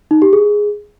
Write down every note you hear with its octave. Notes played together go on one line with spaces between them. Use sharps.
D#4
G4
G#4